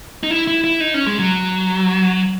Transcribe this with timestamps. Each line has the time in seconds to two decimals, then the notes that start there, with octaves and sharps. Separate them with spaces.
0.23 D#4
0.31 E4
0.47 E4
0.64 E4
0.81 D#4
0.94 C#4
1.07 G#3
1.19 F#3